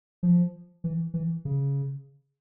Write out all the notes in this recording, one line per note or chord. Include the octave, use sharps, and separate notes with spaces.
F3
E3
E3
C#3